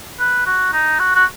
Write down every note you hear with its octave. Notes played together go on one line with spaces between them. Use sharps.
B4
F#4
D#4
F#4
F#4